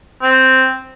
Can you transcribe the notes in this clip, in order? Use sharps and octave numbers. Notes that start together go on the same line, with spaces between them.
C4